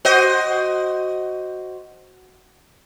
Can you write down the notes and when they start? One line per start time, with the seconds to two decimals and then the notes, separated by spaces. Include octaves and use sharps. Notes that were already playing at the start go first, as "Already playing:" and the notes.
0.05 F#4 C5 D#5